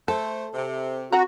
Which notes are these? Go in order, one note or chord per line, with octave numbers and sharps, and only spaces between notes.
A3 A4 C5 A5
C3
C4 F#4 F#5 A#5